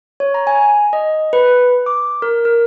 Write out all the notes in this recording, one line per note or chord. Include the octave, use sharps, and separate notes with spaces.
C#5
A#5
G#5
D#5
B4
D6
A#4
A#4